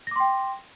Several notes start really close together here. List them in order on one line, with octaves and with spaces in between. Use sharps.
A#6 D6 C6 G5